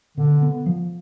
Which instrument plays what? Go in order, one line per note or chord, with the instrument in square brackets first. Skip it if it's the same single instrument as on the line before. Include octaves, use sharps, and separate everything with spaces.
[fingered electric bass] B2 [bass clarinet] D3
[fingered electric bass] B3
F3